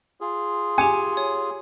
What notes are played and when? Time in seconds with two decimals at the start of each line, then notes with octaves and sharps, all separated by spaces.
0.21 F4 G#4
0.78 G4 G#5 D6 C#7
1.17 C#5